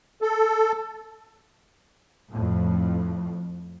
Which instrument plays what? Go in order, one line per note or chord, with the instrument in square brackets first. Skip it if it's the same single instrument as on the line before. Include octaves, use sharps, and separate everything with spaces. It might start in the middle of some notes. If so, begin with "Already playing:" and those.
[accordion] A4
[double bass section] F2 A2